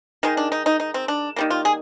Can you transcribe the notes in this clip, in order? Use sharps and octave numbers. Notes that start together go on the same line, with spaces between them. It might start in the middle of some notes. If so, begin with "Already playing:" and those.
D#3 G#3 D#4
D4
D#4
D#4
D#4
C4
D4
D#3 G3 A#3
F4
G#4